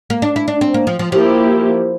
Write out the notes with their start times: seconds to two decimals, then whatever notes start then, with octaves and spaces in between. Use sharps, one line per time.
0.10 A#3
0.22 D4
0.36 E4
0.48 D4
0.61 C4
0.74 A#3
0.87 F3
0.99 F3
1.12 F3 A#3 E4 G4